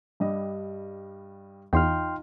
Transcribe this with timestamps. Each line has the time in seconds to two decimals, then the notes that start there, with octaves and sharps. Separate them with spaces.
0.20 G2 G3 D#5
1.73 E2 D#4 F4 G5 C6 F6